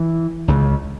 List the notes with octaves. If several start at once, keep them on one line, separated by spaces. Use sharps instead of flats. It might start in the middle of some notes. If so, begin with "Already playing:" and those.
Already playing: E3
C#2 C#3